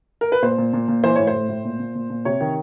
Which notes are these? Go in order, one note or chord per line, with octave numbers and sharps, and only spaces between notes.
A#4
B4
A#2 C5
A#2
A#2
A#2
E3 C5
A2 C#5
C5
A2
A2
A#2
A#2
A#2
A#2
C3 C#5
D#3